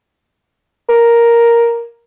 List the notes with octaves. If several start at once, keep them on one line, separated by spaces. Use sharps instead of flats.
A#4